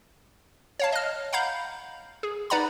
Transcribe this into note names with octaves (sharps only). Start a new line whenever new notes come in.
C#5 F5 A5
D#5 F6
F5 F#5 A#5 B5 G6
G#4
D#4 B4 D5 F#5 A#5 B5